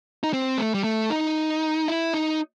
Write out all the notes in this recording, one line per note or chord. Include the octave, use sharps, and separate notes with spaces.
D#4
C4
A3
G3
A3
D#4
E4
D#4